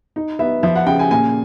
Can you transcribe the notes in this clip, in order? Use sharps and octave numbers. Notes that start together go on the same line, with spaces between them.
D#4
B3 E5
F3 E5
F#5
C#3 G5
G#5
A#2 G#5